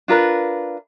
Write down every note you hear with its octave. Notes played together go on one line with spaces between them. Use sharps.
D4 F4 A#4 B4